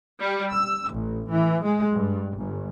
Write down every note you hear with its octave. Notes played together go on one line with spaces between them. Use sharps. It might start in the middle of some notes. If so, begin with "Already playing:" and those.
G3
E6
A1
E3
G#3
G2
G1